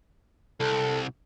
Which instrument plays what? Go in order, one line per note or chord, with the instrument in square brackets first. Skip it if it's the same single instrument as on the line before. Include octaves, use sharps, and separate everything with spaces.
[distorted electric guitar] C2 [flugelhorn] A4